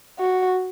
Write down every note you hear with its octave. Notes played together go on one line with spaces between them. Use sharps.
F#4